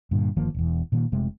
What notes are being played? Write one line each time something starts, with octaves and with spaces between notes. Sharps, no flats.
G2 A#2 D3
G1 D#3 F3 A#3
E1 E2
A#2 D#3 A#3
F1 C3 G#3 A3